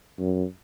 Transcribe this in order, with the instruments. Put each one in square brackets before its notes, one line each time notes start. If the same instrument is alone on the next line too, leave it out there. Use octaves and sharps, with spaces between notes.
[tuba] F#2